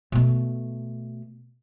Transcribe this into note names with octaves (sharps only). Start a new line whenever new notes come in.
B2 A3